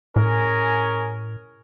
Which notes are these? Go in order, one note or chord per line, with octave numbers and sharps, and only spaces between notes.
A2 C#4 G#4 A#4